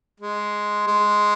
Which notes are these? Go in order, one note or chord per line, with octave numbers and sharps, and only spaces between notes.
G#3
G#3